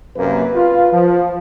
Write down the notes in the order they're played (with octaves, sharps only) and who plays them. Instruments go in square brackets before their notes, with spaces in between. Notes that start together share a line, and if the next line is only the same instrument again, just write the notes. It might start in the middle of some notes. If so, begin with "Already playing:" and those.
[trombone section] F#2 C3 A#3 [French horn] B4
[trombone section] F4
F3